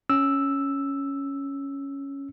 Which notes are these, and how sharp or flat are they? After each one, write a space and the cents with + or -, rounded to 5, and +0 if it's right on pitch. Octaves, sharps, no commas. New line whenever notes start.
C#4 +0 E6 +0